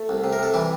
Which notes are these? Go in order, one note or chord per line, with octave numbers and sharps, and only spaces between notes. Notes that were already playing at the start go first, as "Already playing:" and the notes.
Already playing: A3 A4
C2
C3
A#4
C3 A4
E3 G3 G4